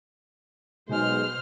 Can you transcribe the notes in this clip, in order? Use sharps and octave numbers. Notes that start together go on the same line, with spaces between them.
B1 B2 G#3 C5 F6